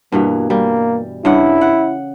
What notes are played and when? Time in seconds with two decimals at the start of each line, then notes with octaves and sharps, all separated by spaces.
0.12 G2 B2 E3 A#3
0.50 G3 A#3
1.25 G2 C#3 E4 F#5
1.61 F#5